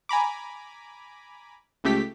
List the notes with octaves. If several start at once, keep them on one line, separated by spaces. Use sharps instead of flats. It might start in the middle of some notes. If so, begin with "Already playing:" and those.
G#5 A#5 B5 D6
C#2 C#3 A3 G4 B6